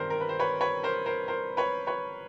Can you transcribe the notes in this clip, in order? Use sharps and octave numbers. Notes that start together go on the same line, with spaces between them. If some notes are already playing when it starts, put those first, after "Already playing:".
Already playing: G2 D#3 G3 C4 A#4 C5
A#4
B4
C5
B4 C#5
B4 C#5
A#4 C5
A#4 C5
A#4 C5
B4 C#5
B4 C#5